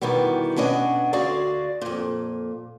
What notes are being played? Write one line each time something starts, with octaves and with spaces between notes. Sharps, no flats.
E2 B2 D#3 E3 G3 B3
B2 C#4 D4 D#5 F#5
D2 F#4 G#4 D5 F5
F2 A#2